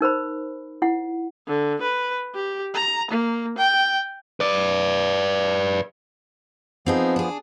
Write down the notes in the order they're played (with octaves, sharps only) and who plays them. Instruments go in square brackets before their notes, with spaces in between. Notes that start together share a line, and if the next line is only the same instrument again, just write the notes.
[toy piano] D#4 A#4 C5 B5
E4 F#5
[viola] D3
B4
G4
A#5
A#3
G5
[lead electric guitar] B4 D5
[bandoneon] F3 B3 [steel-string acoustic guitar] C4 D#4 G#4
[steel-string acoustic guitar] D4 G#4